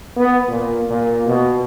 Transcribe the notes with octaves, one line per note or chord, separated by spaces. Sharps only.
B3
A#2
A#2
B2